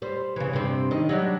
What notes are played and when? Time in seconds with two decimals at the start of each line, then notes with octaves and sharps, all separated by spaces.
0.02 G3 C5
0.36 C#3 E3
0.53 G2 C3 C4
0.91 D#3 D#5
1.09 F#3 G3 D4